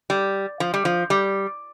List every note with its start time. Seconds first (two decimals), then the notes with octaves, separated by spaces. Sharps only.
0.10 G3
0.60 F3
0.74 G3
0.85 F3
1.10 G3